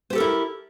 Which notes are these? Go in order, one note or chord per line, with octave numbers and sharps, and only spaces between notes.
E4 G4 A4 A#4 C5